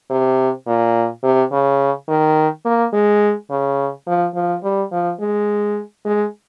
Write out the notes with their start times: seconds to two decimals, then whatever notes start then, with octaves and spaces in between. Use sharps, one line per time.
0.10 C3
0.67 A#2
1.23 C3
1.52 C#3
2.08 D#3
2.65 A#3
2.93 G#3
3.50 C#3
4.07 F3
4.35 F3
4.63 G3
4.92 F3
5.20 G#3
6.05 G#3